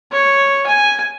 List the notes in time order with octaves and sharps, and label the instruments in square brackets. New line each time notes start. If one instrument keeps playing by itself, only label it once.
[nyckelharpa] C#5
G#5